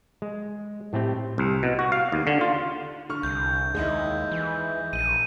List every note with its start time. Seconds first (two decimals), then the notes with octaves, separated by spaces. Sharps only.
0.22 G#3
0.93 A2 A3 C4 G4
1.38 C2
1.63 B2
1.79 F#4
1.92 F5
2.12 D#2
2.27 D3
2.41 F4
3.09 D3 C#6 F6
3.23 C2 G6
3.75 D#2 G#3 D#4 E4
4.32 E3
4.93 A#1 D#7